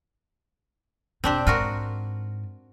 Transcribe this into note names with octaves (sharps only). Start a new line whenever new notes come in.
E1 B2 C4 D4 G4
G#2 F4 F#4 A#4